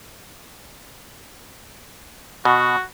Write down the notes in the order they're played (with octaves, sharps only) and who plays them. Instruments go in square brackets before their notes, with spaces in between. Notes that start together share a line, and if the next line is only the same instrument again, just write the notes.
[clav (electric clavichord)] B2 [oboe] F#4